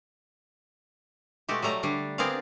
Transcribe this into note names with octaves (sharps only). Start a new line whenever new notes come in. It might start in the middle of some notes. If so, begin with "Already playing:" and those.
B2 G#3 A3 F#4 G4
F#3 G3 A3 A#5
D3 G3 D4
B3 C4 G#4 A#4 D5 F5